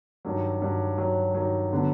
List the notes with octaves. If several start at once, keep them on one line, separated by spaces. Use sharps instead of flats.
G2 D#3 F#3
G2 D#3 F#3
G2 D#3 F#3
G2 D#3 F#3
D3 F#3 B3